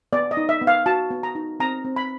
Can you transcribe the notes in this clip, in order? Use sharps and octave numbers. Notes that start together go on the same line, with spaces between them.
B3 D5
D#5
D#4
E5
B3
F5
F#4 A5
B3
A#5
D#4
C4 A#5
C4
B5